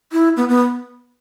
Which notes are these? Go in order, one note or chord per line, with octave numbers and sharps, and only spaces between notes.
E4
B3
B3